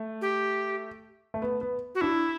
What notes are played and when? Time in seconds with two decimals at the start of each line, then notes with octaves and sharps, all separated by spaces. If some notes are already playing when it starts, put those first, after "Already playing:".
Already playing: A3
0.21 G4
1.34 A3
1.42 B3
1.61 B3
1.95 F#4
2.01 D4 E4